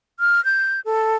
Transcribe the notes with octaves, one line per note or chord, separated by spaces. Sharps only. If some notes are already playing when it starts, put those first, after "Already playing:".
F6
G6
A4